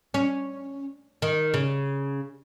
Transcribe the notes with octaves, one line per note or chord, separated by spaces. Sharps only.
C#4
D#3
C#3